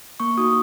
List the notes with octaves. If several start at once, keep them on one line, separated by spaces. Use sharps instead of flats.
A#3 C#6
D#4 F#4 D#6